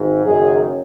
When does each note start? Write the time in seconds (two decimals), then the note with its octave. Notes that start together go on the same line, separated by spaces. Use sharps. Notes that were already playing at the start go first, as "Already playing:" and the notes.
Already playing: G#1 G#2
0.25 F#1 F#2 D#3 G#4